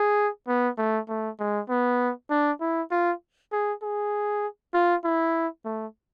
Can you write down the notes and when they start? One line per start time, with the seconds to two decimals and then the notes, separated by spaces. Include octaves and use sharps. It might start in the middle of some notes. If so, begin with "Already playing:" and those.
Already playing: G#4
0.48 B3
0.78 A3
1.09 A3
1.39 G#3
1.70 B3
2.30 D4
2.61 E4
2.91 F4
3.52 G#4
3.83 G#4
4.74 F4
5.05 E4
5.65 A3